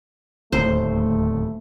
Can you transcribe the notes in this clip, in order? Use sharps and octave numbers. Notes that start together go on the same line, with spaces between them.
D1 D#2 A3 C5